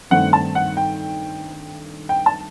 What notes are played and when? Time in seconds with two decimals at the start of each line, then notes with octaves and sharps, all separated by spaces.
0.11 G2 D#3 A3 C4 F#5
0.33 A5
0.55 F#5
0.77 G5
2.09 G5
2.26 A5